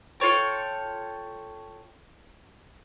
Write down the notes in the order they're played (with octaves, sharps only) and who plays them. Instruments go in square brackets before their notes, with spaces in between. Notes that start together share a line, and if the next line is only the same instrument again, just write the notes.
[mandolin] F4 A4 C#5 G5